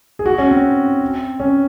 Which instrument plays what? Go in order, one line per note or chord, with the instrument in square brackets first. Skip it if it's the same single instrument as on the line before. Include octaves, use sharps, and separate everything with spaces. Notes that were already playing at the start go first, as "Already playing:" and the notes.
[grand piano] G#4
F#4
C#4
C4
C#4